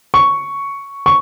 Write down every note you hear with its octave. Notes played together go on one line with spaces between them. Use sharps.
C#6
C#6